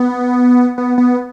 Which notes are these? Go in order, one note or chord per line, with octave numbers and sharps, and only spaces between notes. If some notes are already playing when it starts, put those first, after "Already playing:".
Already playing: B3
B3
B3